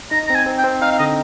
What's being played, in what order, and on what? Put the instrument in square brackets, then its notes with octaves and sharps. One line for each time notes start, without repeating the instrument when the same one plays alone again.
[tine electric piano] D#4 [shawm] A#5
[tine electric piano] C4 [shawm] A#5
[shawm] G#5
[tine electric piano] C4
[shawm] G5
[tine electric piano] C4
[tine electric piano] D#4 [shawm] F5
[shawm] F5
[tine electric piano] D3 [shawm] D#5